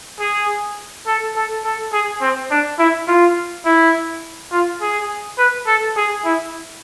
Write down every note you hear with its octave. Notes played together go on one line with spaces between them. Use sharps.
G#4
A4
A4
A4
G#4
C4
D4
E4
F4
E4
F4
G#4
B4
A4
G#4
E4